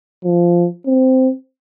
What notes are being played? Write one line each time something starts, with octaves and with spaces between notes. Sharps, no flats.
F3
C4